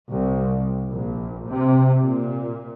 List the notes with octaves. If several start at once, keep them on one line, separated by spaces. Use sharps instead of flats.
C2
A#1
C3
A#2